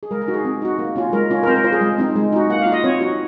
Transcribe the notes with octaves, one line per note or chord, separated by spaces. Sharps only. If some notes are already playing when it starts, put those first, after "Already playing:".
G#4
G#3 A#4
A#4
D#4 F#4
G#4
C4
D#4 F#4
A#3
C#4 F4
G#3 A#4
C#4 F4
A#4
C4 C5
A#4
F4 C5
G#4
G#3
C4 D#4
G#3
D#4 F#4
A#3 F#5
F5
F4
D#5
C4 C#5
D#4 F#4